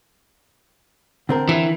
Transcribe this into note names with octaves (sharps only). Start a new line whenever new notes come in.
D3 C4 A#4
E3